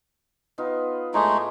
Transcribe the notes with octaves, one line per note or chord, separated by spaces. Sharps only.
B3 D#4 F4
A2 G#3 A3 D#4 G#5 D6